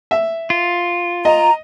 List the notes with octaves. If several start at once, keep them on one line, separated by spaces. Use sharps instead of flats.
E5
F4
D#5 A#5